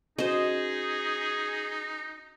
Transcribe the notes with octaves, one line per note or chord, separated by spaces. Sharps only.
C#4 D#4 F#4 G#4 C5 D#5